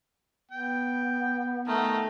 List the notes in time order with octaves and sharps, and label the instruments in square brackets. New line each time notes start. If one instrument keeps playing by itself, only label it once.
[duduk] B3 [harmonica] G5
[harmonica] D#3 A#4 [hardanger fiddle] A3